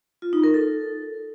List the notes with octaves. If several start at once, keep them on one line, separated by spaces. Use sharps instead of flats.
F4
D#4
A#4
A4